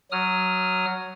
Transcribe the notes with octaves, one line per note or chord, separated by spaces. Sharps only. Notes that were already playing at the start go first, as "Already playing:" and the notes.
F#3 D#6 F6